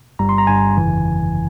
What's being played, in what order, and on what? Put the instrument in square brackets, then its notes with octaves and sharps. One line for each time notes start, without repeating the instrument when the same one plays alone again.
[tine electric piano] G1 G2 G3 A#5
C6
A#5
G1 G2 G3 G#5
G1 F2 C#3 E3